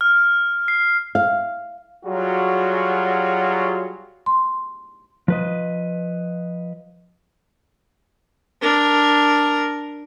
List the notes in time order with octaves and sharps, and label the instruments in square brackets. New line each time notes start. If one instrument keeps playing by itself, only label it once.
[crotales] F6
C7
[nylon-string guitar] F5
[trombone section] F#3 G3 F4 F#4 G#4
[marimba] C6
[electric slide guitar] F3 B4 D#5
[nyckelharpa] D4 A#4